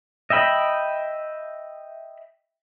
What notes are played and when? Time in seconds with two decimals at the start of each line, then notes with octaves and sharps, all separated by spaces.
0.30 D#5 E5 G5 B5